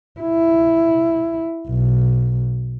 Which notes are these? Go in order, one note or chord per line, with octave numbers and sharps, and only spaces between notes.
E4
B1